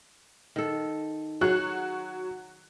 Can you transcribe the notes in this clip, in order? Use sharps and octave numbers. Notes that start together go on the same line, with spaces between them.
D#3 A4
F#3 F#4 G#4 C#5 F#6